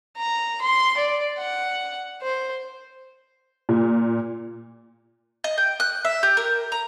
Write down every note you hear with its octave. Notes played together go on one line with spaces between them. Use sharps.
A#5
C6
D5
F#5
C5
A#2
D#5
G5
F#6
E5
G4
A#4
A#5